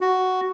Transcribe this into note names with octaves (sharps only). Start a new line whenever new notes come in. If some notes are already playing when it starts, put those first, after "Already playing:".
F#4